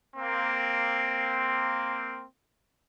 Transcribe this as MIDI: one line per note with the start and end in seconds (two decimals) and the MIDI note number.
0.15 2.23 58
0.15 2.23 60